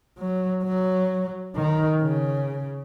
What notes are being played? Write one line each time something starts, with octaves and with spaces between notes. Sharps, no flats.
F#3
F#3
D#3
C#3